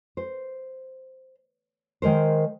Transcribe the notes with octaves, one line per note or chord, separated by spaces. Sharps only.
C5
D#3 G#3 A#4 C5